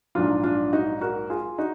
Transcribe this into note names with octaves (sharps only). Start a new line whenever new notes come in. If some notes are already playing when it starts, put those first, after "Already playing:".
A#1 G#2 F#3 D4 F4
D4 F4
D#4 F#4
F#4 A#4
F4 G#4
D#4 F#4